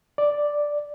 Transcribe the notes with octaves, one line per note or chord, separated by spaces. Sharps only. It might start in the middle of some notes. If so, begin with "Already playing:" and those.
D5